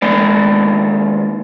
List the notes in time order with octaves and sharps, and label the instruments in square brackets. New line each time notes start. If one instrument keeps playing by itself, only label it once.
[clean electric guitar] D#2 G#3 D5